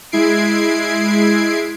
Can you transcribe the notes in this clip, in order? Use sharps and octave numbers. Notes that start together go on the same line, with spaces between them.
G#3 E4 G#6 C7 D7